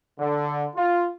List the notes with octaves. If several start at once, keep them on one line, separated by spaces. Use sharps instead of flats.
D3
F4